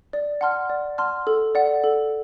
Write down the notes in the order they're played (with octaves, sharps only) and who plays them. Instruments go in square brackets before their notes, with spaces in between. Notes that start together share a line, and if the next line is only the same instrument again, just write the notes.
[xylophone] D5
F#5 A5 C6 F6
D5
F#5 A5 C6 F6
A4
D5 F#5
A4